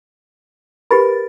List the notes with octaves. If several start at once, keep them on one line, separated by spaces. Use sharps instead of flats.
G4 A#4 B4 B5 A6